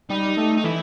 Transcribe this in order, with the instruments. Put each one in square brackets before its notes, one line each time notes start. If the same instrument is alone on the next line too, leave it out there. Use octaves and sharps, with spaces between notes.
[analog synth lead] G3 [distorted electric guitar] D#4
[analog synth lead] A3
[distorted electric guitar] D#4
[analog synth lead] E3 [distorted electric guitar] E4